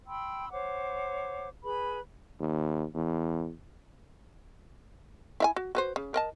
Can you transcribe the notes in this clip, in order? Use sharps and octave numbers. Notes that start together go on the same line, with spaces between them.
G5 B5 C6 E6
C5 C#5 F#5 D6
G#4 B4 B5
D#2
E2
E4 E5 G#5
F#4
F#4 B4 C5
C#3
A#4 D#5 A5